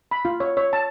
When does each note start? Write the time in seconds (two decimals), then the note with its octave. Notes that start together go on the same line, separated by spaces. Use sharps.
0.11 B5
0.25 F4
0.40 C#5
0.57 C#5
0.73 A5